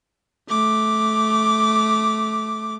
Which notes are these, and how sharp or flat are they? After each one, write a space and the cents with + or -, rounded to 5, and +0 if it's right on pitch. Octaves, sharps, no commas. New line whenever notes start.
A3 -15 D6 +0